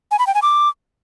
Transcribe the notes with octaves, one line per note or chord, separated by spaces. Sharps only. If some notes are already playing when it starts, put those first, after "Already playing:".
G#5
B5
G5
G#5
D6